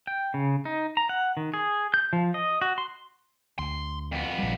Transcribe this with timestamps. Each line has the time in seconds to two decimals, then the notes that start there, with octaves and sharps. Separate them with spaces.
0.07 G5
0.34 C#3
0.65 D#4
0.97 A#5
1.09 F#5
1.37 D#3
1.54 G#4
1.94 G6
2.13 F3
2.34 D#5
2.62 F#4
2.78 C6
3.59 D2 C6
4.12 F2 B3
4.38 A#1 G3